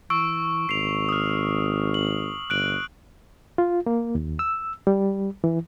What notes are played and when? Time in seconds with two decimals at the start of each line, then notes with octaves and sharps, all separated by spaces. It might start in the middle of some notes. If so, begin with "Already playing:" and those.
0.10 E3 C#6 E6 D7
0.69 G#1 C7 F7
1.09 D#6 F6
1.94 F#7
2.50 G1 F#6 D7 F#7
3.58 F4
3.86 A#3
4.15 D#2
4.39 E6
4.87 G3
5.44 E3